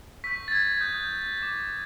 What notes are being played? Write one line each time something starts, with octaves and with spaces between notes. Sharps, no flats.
C#6 E6 G6 B6
A6
G#6
G#6
D#6 F#6 G6
D6 G6